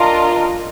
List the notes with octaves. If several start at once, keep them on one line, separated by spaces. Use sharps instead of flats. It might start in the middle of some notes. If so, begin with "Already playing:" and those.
Already playing: D4 F4 A#4 D#5